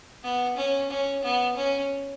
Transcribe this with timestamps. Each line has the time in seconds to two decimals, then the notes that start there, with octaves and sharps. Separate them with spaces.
0.23 B3
0.56 C#4
0.90 C#4
1.23 B3
1.56 C#4